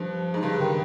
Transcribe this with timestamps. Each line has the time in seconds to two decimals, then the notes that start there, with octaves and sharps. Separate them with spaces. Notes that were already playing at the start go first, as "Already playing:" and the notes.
Already playing: G2 F3
0.34 G#2
0.43 G2 C#3
0.60 D#3